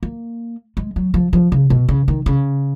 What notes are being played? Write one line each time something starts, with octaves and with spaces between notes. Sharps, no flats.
A#3
G#3
F#3
F3
F3
C#3
B2
C#3
D#3
C#3